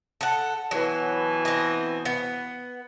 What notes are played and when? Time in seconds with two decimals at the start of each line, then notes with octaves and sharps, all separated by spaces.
0.21 A4 F#5
0.71 B2 E3 F#3
1.45 C4 D#5
2.05 B3